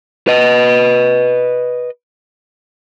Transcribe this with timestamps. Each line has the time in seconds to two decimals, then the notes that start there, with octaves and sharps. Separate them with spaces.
0.28 B4 D#5